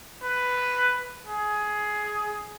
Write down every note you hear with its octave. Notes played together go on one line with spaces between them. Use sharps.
B4
G#4